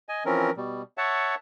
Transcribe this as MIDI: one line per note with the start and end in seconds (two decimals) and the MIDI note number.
0.09 0.23 75
0.09 0.23 80
0.26 0.51 52
0.26 0.51 53
0.26 0.51 60
0.26 0.51 61
0.26 0.51 70
0.57 0.82 47
0.57 0.82 55
0.98 1.35 73
0.98 1.35 76
0.98 1.35 78
0.98 1.35 81